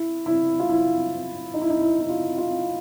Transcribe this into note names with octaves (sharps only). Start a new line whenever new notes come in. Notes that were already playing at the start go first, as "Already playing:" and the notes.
Already playing: E4
E4
F4
E4
D#4
E4
D#4
E4
E4
F4
F4